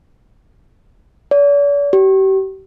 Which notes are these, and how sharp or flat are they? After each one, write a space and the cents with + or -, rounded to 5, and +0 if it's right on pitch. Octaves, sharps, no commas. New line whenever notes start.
D5 -45
G4 -35